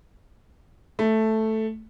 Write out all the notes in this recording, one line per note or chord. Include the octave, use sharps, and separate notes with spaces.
A3